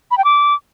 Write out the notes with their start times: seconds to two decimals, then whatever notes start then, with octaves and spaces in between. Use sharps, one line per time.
0.11 B5
0.18 G5
0.24 D6